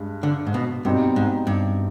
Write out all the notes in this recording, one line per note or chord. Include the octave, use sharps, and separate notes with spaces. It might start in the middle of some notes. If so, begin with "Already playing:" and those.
Already playing: G2 G#3
D3
G#2
B2
G2 B2 G3 C4 D#4 G4
G#2
G2